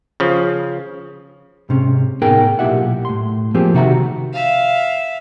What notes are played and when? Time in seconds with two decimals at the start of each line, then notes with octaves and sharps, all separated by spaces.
0.20 C#3 F3
1.69 G#2 C3 C#4
2.21 A2 B3 D#4 G#4 A#4 G5
2.59 B1 A#2 E4 G4 E5 F#5
3.05 A2 C6
3.54 F3 A#3 C4 G4 G#4
3.74 C3 D#3 F#4 E5 A#5
4.33 E5 F5